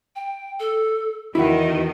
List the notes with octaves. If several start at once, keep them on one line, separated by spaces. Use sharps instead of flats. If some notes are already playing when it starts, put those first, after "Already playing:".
G5
A4
E2 D#3 E4 F#4 F#5